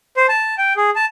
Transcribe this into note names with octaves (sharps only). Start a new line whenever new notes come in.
C5
A5
G5
G#4
A5